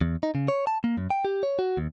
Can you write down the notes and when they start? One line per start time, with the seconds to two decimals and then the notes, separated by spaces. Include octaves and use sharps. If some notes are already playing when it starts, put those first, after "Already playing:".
0.01 E2
0.23 D#4
0.35 C#3
0.48 C#5
0.67 A5
0.84 A#3
0.97 F#2
1.10 G5
1.25 G4
1.43 C#5
1.59 F#4
1.77 D#2